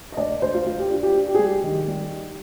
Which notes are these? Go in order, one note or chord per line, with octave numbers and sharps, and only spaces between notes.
D#5
D2 D5
D2 C5
F4
D2 F4
G4
D4 F4
G4
D4
G4
G#4
G3 G4
D#3
G3
D#4